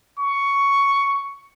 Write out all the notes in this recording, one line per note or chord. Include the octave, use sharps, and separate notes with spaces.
C#6